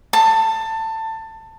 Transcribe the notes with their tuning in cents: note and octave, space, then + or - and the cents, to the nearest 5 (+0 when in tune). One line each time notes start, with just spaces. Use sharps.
A5 +20